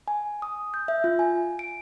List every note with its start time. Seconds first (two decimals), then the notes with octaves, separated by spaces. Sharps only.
0.08 G#5
0.42 D#6
0.74 G6
0.88 E5
1.04 F4
1.19 G#5
1.59 D7